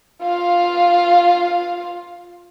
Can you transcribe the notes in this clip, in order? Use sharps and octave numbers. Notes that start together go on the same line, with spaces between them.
F4 F5